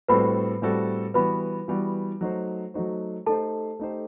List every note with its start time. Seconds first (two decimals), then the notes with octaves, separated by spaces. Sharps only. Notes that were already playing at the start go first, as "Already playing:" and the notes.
0.08 A2 G3 C4 F#4 A4 B4 B5
0.62 A2 G3 C4 F#4 A4
1.14 E3 G3 B3 F#4 B4 B5
1.68 E3 G3 B3 F#4
2.21 F#3 A3 D#4 F#4 C5
2.74 F#3 A3 D#4 F#4 C5
3.26 A3 D#4 G4 A4 C5 A5
3.79 A3 D#4 G4 C5